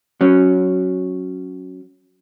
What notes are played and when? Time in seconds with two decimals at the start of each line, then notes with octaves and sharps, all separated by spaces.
0.21 F#3 C#4